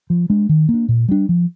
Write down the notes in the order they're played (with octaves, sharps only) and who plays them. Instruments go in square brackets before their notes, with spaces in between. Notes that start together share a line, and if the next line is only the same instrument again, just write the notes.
[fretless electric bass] F3
G#3 D4
D#3
A#3
D4
A#2
G3 D4
F3